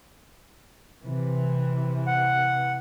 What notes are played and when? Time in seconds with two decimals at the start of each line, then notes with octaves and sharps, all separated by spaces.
1.04 C3 E3
2.07 F#5